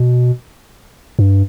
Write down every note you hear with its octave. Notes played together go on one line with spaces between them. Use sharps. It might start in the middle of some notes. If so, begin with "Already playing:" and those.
Already playing: B2
G2